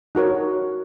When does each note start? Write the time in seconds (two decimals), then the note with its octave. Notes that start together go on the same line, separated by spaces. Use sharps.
0.15 D#4 F#4 A#4 C#5